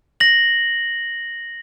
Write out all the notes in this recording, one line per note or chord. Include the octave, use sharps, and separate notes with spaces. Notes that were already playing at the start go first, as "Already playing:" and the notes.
A#6 F#7